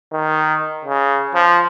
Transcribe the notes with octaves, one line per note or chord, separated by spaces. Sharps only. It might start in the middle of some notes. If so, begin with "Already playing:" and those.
D#3
C#3
F3